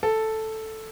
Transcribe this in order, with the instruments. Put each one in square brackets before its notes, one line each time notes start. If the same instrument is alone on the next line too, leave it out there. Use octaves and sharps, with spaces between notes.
[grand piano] A4